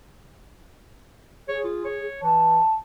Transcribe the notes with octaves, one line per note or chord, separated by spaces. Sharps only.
G#4 C#5
F4
C#5
E3 A5